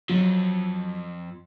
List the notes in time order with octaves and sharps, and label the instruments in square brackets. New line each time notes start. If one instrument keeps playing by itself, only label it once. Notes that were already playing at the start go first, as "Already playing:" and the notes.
[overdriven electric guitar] F2 F3 [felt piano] F#3